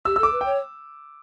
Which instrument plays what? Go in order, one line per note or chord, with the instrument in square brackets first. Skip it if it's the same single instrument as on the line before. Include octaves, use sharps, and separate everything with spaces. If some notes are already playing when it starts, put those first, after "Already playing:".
[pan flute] G4 [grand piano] E6
[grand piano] E6
[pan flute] A4 [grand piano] D6
[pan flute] B4
[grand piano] G5
[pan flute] C#5